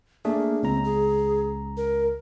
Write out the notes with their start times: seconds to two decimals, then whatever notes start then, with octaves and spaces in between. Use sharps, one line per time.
0.25 A3 A#3 D4 G#4
0.63 C#2 C4 A#5
0.85 G#4
1.77 A#4